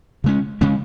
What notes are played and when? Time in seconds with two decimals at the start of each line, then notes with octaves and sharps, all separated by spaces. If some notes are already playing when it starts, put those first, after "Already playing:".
0.24 C#3 G#3 C#4
0.61 C#3 G#3 C#4